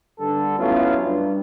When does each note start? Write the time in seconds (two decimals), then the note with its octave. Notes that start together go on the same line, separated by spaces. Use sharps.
0.19 G2 D3 A4
0.59 F#3 A3 B3 C#4 E4 F4
1.02 G2